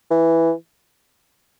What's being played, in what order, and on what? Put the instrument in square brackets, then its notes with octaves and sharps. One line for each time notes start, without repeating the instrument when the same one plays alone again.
[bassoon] E3